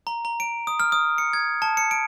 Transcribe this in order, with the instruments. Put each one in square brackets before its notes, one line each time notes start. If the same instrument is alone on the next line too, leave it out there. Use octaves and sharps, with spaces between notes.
[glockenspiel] A#5
A#5
D7
D#6
F6
D#6
C#7
G#6
A5
C#7
D7